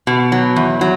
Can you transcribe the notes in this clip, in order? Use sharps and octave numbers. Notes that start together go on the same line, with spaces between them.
B2
F#3
E2
F#3